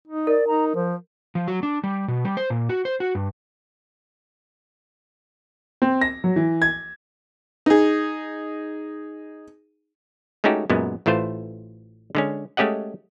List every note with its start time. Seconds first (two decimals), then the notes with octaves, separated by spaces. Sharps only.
0.07 D#4
0.27 A#4 D5
0.47 D#4 A#5
0.75 F3 C5
1.35 F3
1.48 F#3
1.63 D4
1.84 G3
2.08 B2
2.25 G3
2.37 C5
2.50 A#2
2.69 F#4
2.85 C5
3.00 F#4
3.15 G2
5.82 C4
6.01 A#6
6.24 F#3
6.36 E3
6.62 G#6
7.66 D#4 G#4
10.44 G#3 A3 C#4 D#4 F#4 G4
10.70 F#2 A#2 G#3 B3
11.06 A1 E3 A3 F4 C5
12.15 D3 G#3 C#4
12.57 G#3 A3 C#4 G4 D#5 F#5